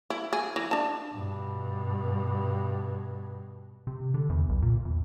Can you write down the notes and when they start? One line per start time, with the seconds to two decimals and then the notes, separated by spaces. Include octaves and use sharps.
0.10 E4
0.33 G#4
0.56 E3
0.71 D4 A5
1.14 G2 B2
3.87 C3
4.14 D3
4.29 E2
4.49 B1
4.62 A#2
4.85 E2